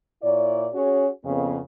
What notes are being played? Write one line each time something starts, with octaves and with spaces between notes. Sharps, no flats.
A#2 E4 C#5 D5
C#4 F#4 G#4 C#5
F2 C#3 B3